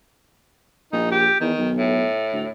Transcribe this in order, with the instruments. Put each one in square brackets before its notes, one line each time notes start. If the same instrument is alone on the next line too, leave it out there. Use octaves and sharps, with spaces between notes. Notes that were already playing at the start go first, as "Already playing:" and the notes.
[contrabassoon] A#1 [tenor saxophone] D#4
[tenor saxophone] G4
[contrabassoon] E2 [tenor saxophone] D#3
[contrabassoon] B1
[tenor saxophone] A2
[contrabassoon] D2